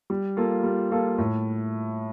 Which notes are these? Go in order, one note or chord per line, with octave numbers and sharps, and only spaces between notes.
G3
A#3 F4 A4
G3
A#3 F4 A4
A2